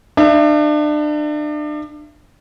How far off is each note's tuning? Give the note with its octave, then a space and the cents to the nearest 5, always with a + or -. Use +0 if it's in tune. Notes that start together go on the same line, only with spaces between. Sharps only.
D4 +35 E5 +35